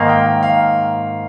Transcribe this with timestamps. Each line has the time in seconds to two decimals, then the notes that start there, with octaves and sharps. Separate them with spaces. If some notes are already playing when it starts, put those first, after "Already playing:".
Already playing: G#2 D#3 A#3 F5
0.09 G5
0.26 G5
0.43 F5